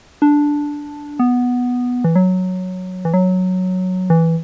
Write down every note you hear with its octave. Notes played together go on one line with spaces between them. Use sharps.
D4
B3
E3
F#3
E3
F#3
E3